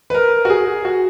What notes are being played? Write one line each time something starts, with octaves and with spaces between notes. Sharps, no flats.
B4
A#4
F#4
G#4
F#4